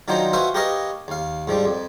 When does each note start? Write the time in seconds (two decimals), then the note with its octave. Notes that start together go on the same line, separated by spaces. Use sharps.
0.08 D#3 F#3 D4 D#4 F4 C5
0.33 F#4 B4 C5 E5 F5 G#5
0.54 G4 A#4 B4 C#5 D#5 F5
1.08 D#2 F5
1.47 G#2 F3 G3 D4
1.65 F2